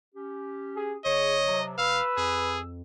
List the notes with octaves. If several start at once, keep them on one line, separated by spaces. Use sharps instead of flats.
C#4 G4
G#4
G1 G#4 C#5 D#5
C3 F3 F#3
F1 B4 F5 E6
F2 G#4